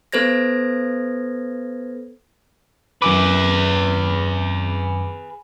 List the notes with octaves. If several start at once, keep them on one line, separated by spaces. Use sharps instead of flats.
B3 A4 B4 C5 G#6 A#6
F#2 G#4 B4 D6